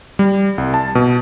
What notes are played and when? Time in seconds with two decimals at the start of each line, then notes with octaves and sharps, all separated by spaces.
0.19 G3
0.58 C2
0.74 A5
0.95 B2